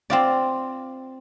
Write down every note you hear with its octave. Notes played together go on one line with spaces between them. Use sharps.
C4 F4 D5